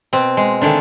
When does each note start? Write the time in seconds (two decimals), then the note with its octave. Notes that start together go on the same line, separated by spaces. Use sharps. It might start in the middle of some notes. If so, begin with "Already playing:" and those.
0.13 B2 C4
0.37 G#3
0.61 D3 D#3 G#3 A3